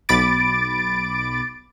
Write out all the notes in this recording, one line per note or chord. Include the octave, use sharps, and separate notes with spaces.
B1 B5 D6 A6 D7